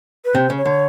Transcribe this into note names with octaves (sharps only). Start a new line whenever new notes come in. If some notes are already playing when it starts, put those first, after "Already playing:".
B4
C3 C5
C#3
C#5
D3